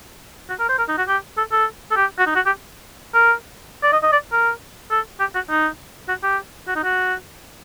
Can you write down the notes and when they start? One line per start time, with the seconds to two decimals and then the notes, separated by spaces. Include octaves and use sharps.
0.49 F#4
0.59 A#4
0.69 C5
0.78 A#4
0.89 D#4
0.98 F#4
1.08 G4
1.38 A4
1.52 A4
1.91 A4
1.96 G4
2.19 F#4
2.26 D#4
2.35 F#4
2.46 G4
3.14 A#4
3.83 D5
3.93 D#5
4.03 D#5
4.12 D5
4.32 A#4
4.91 A4
5.20 G4
5.35 F#4
5.50 D#4
6.09 F#4
6.23 G4
6.68 F#4
6.76 D#4
6.84 F#4